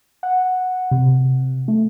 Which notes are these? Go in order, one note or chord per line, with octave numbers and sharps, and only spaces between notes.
F#5
C3
A3